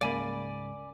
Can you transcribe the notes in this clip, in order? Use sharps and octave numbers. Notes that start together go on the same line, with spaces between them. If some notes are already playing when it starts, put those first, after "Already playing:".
C#2 G#2 C#3 A#3 D5 G#5 B5